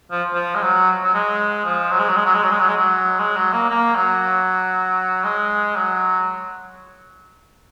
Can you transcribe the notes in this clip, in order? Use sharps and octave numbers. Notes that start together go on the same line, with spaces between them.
F3
F3
G#3
F#3
F#3
G#3
F3
F#3
G#3
F#3
G#3
F#3
G#3
F#3
G#3
F#3
G#3
F#3
G#3
F#3
A#3
A#3
F#3
G#3
F#3